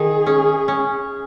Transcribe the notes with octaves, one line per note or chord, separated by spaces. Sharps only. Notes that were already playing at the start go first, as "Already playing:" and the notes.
Already playing: D#3 G#4
C#4
C#4